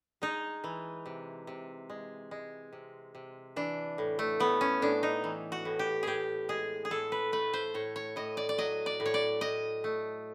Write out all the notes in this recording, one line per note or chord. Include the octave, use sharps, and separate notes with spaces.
G#3 D#4
E3
C3
C3
G#3
G#3
C3
C3
E3 D4
A2
A3
A2 B3
C#4
A2 D4
D#4
E3
F#4
A2
G4
A2 G4 G#4
G#3 G#4
G#4
A2 A4
B4
A3 B4
C5
A2 C#5
C#5
A2 D#5
D5
D5
F#3 D#5
D5
A2
C#5
D5
A2 D#5
A3